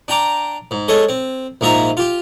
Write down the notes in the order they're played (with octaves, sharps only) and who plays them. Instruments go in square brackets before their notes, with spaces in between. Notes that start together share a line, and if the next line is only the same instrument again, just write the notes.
[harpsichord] D4 G5 A#5 D6
G#2
G#3 A4 C#5 D#5
C4
A#1 G#2 G#3 F4 E5 A#5
F4 G4